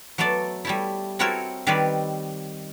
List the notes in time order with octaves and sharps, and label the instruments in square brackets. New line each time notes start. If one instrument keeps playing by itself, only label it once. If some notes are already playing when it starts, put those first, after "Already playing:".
[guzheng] F#3 A3 B3 A4 D5
G3 A3 E4
C4 E4 F#4 A4 A#4 C#5
D#3 G3 C4 B4 C#5 D5